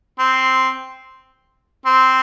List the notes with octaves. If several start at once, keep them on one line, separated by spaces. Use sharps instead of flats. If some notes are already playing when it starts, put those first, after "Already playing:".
C4
C4